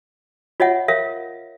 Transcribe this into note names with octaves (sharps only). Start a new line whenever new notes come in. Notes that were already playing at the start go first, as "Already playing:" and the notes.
F4 C#5 D#5 E5 F#5
A#4 C#5 E5 F5